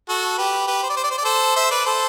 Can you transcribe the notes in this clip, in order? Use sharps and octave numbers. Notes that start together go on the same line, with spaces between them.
F#4 A4
G4 B4
G4 B4
C5
D5
C5
D5
C5
D5
A4 C5
C5 E5
B4 D5
A4 C5